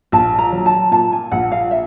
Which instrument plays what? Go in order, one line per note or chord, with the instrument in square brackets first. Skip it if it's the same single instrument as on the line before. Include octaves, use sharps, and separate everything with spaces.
[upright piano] A#1 [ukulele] A5
[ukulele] A#5
[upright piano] F#3
[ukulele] A5
[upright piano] A#2 [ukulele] A5
[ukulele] G#5
[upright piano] A#1 [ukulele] F#5
[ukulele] F5
E5